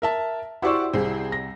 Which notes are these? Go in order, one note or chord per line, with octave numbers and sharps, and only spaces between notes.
A#4 E5 A5
E4 F#4 G4 C5 D5 C6 C#6 E6
C2 G3 C4 G#4
A#6